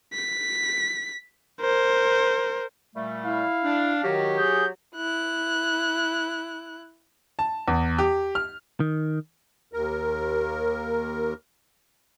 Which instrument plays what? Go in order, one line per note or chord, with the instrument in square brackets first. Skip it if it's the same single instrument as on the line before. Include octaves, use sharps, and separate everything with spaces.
[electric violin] B6
A#4 C5
[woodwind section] A#2 G3 A3
[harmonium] E4 [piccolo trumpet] F5
[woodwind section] D4
[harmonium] D#3 [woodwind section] F#3 F#4 G4
[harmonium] G#4 [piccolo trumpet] G6
[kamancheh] E4 F#6
[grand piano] A5
E2
G4
F6
[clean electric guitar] D#3
[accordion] D#2 A#4